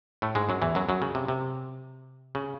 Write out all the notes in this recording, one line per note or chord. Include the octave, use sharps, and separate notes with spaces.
A2 A3
G#2 G#3
F#2 F#3
E2 E3
F#2 F#3
F#2 F#3
C#3
C3
C3
C#3